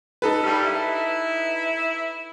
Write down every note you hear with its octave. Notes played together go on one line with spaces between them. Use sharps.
D#4 A4 B4
G2 G3
E4